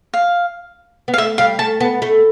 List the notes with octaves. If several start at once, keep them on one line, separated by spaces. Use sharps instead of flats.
F5
B3
F5
A3 E5
G3 F5
A3 A5
B3 A5
A3